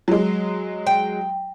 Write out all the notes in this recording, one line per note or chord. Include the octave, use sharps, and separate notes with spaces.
F#3 G#3
G5